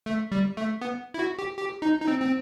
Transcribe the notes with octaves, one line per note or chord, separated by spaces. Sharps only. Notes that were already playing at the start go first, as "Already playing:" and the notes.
A3
G3
A3
B3
E4
F#4
G4
G4
D#4
D#4
C4
C4